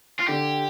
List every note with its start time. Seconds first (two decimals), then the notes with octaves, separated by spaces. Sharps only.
0.20 F4
0.28 D3 G4